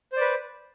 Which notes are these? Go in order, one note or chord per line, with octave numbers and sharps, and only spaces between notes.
B4 C5 D5